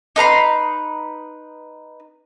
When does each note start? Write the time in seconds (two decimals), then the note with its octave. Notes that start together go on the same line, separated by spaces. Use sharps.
0.16 D#4 B4 A#5 C6